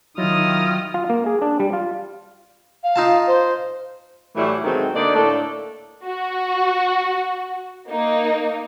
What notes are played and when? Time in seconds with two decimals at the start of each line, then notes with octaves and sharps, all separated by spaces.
0.18 D#3 F#3 E4 F4 D#5 D#6 F6
0.94 F4
1.09 A#3
1.26 G#4
1.42 D4
1.60 G3
1.73 F4
2.83 F5
2.96 D#4 F4 A5
3.27 C5
4.35 A2 E3 F#3 G3 A3 E4
4.64 B2 D#3 F#3 G#3 A3 C4
4.94 D3 A#3 D#4 D5
5.15 A2 A3 A#3 D4 A4
6.05 F#4
7.89 A#3 D#4